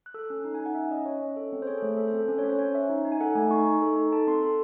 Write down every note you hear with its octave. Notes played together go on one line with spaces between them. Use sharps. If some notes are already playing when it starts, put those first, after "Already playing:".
F#6
A4 E6
C#4 F#6
D#4 F#6
G#5
D#4
F#5
C#4 E5
C#4 D#5
C#4 C#5
C#4
A4
C4
C5
G#4 C#5
A4
A3
C5
A4
C5
C4
A4
C#4 C5
C#5
C#4
C5
C#4 C#5
C#4 E5
D#4
D#4
G#5
A4 F#5
A3 G#5
D#4 C#6
D#4
A4
D#4
A4 A5
C4 C6
A4